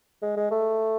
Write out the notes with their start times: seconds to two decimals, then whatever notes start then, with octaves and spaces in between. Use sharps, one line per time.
0.22 G#3
0.37 G#3
0.51 A3